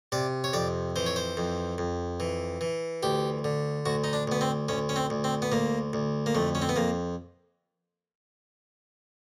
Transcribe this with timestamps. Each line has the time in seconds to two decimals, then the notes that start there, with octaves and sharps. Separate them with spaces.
0.12 C3 D5
0.44 C#5
0.53 F2 D5
0.96 E3 C5
1.06 C#5
1.16 C5
1.37 F2
1.78 F2
2.20 E3
2.61 E3
3.03 D2 G4
3.44 D3
3.86 D2 F#4
4.04 D#4
4.13 D4
4.28 D2 B3
4.41 C4
4.69 D2 C#4
4.89 C#4
4.96 C4
5.10 D2
5.24 C4
5.42 B3
5.52 D2 A#3
5.93 D2
6.26 A#3
6.35 F2 A3
6.55 C#4
6.62 C4
6.69 B3
6.76 F2 A#3